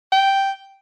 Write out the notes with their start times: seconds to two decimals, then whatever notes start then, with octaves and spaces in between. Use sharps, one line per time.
0.12 G5